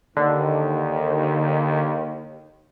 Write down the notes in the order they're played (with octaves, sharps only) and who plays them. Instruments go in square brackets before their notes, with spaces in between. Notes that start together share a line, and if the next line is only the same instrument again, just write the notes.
[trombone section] D#2 [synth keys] D3